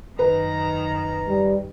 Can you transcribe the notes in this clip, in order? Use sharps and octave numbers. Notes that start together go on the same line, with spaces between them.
F#2 D#3 B4 A#5
G3